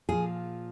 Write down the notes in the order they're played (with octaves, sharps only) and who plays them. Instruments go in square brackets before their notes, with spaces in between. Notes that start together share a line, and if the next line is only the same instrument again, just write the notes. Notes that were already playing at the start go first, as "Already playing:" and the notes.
[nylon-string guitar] A#2 F3 G#4